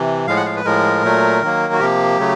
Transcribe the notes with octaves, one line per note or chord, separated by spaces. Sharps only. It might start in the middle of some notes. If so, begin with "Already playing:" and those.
Already playing: C3 E3
A2 F3 G#3 F5
F#5
F5
B4
A2 F3 G#3 A#4
A#2 F#3 A3
D#3 F#3 A#3
F#4
C3 F3 A#3 G4
C#3 F#3 A3